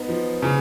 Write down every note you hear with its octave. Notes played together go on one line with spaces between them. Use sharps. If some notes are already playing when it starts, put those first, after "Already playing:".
Already playing: B3 D#4
F3
C#3